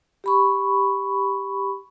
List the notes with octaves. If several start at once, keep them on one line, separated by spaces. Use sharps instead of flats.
G4 B5 C#6